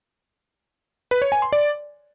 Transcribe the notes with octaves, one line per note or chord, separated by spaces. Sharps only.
B4
C#5
G#5
C6
D5